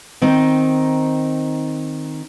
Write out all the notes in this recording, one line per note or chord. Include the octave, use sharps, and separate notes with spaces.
D#3 C4 D#4